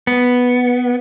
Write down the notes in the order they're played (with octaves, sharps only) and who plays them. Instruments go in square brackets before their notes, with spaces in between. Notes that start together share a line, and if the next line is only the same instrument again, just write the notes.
[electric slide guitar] B3